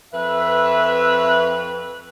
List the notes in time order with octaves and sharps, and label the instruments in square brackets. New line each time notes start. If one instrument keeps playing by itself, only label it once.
[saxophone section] F2 B4 [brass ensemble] E5